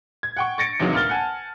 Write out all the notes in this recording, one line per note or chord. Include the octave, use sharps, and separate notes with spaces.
G#6
F#5 G5 C#6
C#6 A6 A#6 C#7 D7
E2 C3 D#3 F#3 G#3 A#3
D2 A#3 F6 A6 G7
F#5 G#5 A5